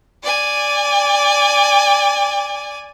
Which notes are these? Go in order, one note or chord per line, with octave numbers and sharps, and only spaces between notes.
D5 G#5